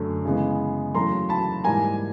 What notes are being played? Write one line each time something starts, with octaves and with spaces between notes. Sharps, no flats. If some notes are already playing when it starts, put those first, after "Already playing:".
Already playing: F#2 D3 F#3 A3
C#3 E3 G#3 B3
E2 C#3 F#3 A3 A#5 C6
A5 B5
G#2 E3 G3 A#3 G#5 A#5